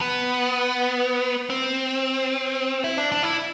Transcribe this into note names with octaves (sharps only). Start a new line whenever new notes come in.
B3
C4
E4
D4
D4
E4